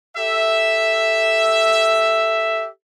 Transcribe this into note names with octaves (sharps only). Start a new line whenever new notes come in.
G4 A4 E5